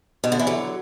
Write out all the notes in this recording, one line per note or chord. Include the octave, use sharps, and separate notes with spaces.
B2
D3
E3
D3 F#3